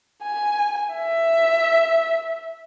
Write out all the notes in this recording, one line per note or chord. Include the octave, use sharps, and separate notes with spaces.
G#5
E5